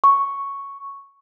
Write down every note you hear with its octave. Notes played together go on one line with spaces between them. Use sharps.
C#6